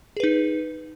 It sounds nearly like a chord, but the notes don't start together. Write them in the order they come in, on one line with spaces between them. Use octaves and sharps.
G#4 B4 D#4